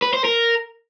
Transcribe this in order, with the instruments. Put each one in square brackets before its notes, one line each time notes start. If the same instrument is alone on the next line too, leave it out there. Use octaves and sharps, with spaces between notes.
[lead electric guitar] B4
C5
A#4